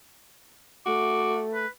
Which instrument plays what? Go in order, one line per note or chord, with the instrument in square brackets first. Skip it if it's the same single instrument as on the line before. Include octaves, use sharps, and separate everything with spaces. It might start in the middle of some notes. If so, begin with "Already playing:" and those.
[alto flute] A3 [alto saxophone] F#4 [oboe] D6
[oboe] B4